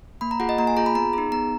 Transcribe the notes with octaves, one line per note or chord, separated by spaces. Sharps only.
A#3 B5
A#5
F4 G#4 F#5
D#5
A#3 A#5
G#5
F4 G#4 A#5
B5
B3 A#5
D#4 G#4
B3 A#5